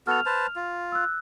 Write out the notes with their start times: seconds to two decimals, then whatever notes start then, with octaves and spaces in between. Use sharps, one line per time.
0.07 B3 F#4 A4 F6 F7
0.26 B4 C5 A5
0.56 F4
0.92 E6 F#6